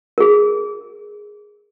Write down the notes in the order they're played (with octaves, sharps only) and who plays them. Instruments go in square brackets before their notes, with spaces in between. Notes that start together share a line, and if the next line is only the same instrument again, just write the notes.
[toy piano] G#4 A#4